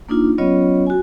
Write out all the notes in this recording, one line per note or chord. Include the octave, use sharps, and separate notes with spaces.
A#3 D4 D#4 F4
F#3 B3 C#4 F4 C#5 D#5
F#4 G#5